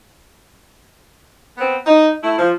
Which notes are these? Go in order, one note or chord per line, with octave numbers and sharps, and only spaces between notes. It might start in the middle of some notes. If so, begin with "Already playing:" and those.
B3 C4
D#4
A3 E4
F3